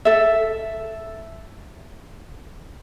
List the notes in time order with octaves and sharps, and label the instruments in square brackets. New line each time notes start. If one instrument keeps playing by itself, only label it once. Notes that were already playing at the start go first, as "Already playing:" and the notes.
[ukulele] A4 E5